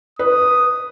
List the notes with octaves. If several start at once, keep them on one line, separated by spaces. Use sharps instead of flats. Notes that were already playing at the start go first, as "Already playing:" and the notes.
B4 D#6